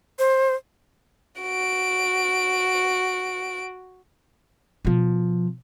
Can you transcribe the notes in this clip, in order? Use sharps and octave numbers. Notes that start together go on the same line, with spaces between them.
C5
F#4 D7
B2 F3